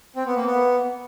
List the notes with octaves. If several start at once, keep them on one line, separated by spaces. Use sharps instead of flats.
C4
B3
A#3
B3